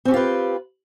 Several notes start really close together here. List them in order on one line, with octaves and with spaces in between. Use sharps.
C4 C#4 G4 F4 B4